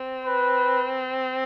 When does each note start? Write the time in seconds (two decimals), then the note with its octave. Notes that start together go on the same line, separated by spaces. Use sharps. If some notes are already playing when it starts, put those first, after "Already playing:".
Already playing: C4
0.25 B4